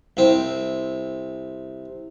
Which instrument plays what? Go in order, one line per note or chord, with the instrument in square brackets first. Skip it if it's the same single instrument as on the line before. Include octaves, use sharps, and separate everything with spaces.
[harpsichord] C2 C4